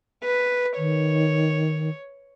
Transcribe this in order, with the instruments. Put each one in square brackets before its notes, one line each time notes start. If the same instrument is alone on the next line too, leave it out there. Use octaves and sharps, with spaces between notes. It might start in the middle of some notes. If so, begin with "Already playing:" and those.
[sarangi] B4
[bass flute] D#3 [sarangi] C#5